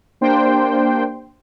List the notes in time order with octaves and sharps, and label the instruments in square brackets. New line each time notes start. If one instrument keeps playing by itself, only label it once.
[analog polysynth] A#3 D4 G4 C5 G5 C6